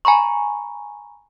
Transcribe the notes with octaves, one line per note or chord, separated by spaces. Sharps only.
G#5 A#5 B5 C#6